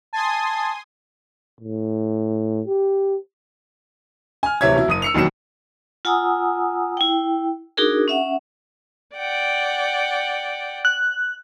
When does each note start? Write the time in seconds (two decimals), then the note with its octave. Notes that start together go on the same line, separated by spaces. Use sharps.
0.13 G#5 A5 C6 D#6
1.61 A2
2.67 G4
4.43 G#5 F6
4.61 D1 C3 E3 C#5 E5 G#6
4.76 B2 E4
4.88 F#1 D#6 D#7
5.02 E6 C#7 F7
5.14 E1 D#2 D#3 F#3 C#7 E7
6.05 F4 F#5 G#5 A#5 D#6 E6
6.97 E4 G5
7.77 D4 D#4 F#4 G#4 A#4
8.08 C#4 E5 F#5
9.16 D5 F#5 G5
10.85 F#6